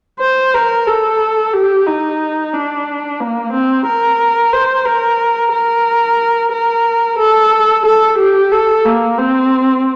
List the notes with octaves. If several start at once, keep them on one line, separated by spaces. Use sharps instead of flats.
C5
A#4
A4
G4
D#4
D4
A#3
C4
A#4
C5
A#4
A#4
A#4
A4
A4
G4
A4
A#3
C4